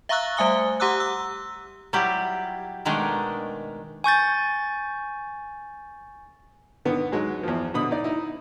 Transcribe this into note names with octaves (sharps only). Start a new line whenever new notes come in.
E5 F5 A#5 C#6 E6 F#6
G3 A3 E5 G#5 D#6 G7
G4 F#5 A#5 D6 E6 F#6
E6
F#3 G3 E4 F4 G4
B2 D#3 G#3 A3 D4 A#4
G#5 C#6 G6 A6
D3 D#3 B3
G#2 F#3 G#3
E2 F3
B2 D3 B5 D#6
D#4 D5
D#4 E4